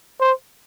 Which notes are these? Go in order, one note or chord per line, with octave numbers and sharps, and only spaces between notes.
C5